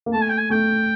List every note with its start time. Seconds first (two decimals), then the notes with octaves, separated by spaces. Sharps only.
0.06 A#3
0.13 A3 A5
0.21 G#5
0.29 G5
0.38 G#5
0.50 A3 G5